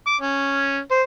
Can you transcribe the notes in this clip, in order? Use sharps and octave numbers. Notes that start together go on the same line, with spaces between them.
D6
C#4
C5